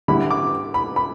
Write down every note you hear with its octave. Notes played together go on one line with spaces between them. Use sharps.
D3 G3 E4 B5
D6
B5
B5